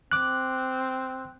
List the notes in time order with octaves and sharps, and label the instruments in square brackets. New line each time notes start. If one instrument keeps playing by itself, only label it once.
[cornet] C4 [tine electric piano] D6 F#6